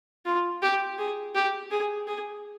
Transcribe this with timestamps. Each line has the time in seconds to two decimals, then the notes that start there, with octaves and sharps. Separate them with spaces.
0.25 F4
0.62 G4
0.98 G#4
1.35 G4
1.71 G#4
2.07 G#4